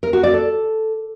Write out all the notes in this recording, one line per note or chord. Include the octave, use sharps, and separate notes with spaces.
A#4
F#4
D5
A4